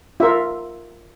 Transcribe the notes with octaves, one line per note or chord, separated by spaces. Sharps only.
F4 A#4 E5